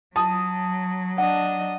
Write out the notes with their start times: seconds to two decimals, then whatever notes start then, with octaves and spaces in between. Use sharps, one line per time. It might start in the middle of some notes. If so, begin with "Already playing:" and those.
0.16 F#3 A5 D#6
1.18 D4 D#5 F#5